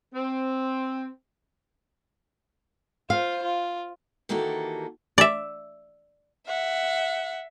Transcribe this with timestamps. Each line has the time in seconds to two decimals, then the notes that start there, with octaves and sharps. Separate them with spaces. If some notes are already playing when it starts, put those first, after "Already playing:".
0.14 C4
3.10 F4 C5 F5
3.43 F4
4.29 D#3 E3 A#3 F#4 G4 A4
5.18 D5 E5
6.47 E5 F#5